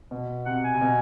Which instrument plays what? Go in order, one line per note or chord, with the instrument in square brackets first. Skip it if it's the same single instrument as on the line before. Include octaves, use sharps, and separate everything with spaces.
[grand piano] B2
[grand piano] C3 [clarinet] F#5
[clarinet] G#5
[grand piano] C3
B2